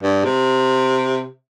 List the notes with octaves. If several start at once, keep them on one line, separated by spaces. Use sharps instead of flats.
G2
C3